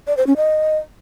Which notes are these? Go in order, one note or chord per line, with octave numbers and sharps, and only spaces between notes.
D5
C5
C#4
D#5